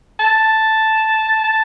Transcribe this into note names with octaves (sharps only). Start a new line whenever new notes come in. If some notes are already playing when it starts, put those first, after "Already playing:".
A5
A5